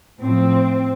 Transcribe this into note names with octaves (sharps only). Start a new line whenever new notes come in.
A2 F3 C4